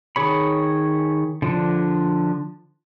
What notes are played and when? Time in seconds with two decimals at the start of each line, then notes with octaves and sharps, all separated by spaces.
0.16 D#3 G#4 C#5 B5
1.42 D3 F3 D4